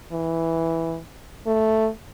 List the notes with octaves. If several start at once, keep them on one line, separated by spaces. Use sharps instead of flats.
E3
A3